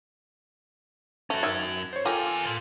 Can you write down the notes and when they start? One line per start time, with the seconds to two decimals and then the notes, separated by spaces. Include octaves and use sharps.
1.30 A3 C#4 F#4
1.43 D#3 E5 G#6
1.93 C5 C#5
2.06 A#3 B3 F4 G4 A4 G#5
2.46 A#4 C6